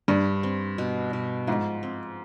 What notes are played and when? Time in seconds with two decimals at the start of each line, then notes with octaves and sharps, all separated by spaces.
0.08 G2 G3
0.43 C4
0.78 B2
1.13 B2
1.47 G#2 F3
1.83 C4